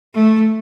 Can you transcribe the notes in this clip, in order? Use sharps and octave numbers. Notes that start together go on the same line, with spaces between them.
A3